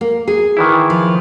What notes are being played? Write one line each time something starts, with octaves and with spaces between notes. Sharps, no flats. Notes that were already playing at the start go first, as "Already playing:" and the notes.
A#3
G#4
D#3 E3 E4
F3